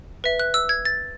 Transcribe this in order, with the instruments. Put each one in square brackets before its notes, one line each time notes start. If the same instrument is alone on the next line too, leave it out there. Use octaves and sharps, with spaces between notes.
[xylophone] B4 E5
F#6
E6
G#6
A6